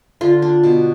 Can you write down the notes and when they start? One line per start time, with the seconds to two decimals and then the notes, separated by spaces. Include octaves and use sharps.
0.21 D3 F4
0.42 D4
0.63 B2